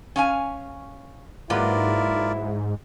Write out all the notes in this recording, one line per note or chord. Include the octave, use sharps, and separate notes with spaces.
C#4 F5 G#5
G#2 F#3 A#3 E4 F4 A#4 B4 D5